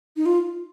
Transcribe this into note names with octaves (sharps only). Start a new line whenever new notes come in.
D#4
F4